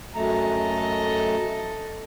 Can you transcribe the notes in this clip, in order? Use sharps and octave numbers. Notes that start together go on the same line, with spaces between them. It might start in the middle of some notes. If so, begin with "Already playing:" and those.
F#2 A3 A4 D#5 A#5